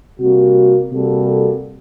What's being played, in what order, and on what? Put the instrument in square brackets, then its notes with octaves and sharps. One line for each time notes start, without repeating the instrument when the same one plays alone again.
[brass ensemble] C3 G3 A#3 F#4
C3 G3 A#3 F#4 A4